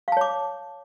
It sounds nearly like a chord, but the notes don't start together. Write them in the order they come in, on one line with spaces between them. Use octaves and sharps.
F5 A5 C#5 D6